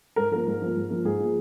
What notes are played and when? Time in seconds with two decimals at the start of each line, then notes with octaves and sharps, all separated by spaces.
0.16 G#2 A#4
0.31 F3 A#3 A#4
0.47 G#2
0.62 F3 A#3
0.75 G#2
0.90 F3 A#3
1.05 G#2 G#4
1.20 F3 A#3